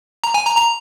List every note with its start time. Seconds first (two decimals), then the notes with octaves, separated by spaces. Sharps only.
0.24 A#5
0.34 G#5
0.46 A#5
0.57 A#5